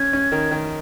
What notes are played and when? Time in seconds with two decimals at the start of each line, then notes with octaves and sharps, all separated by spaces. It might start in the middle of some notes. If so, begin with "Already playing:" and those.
Already playing: C#4 G#6
0.13 C#4
0.32 D#3
0.51 D#3